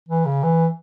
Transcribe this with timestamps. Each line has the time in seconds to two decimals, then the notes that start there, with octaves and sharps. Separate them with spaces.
0.09 E3
0.26 C#3
0.43 E3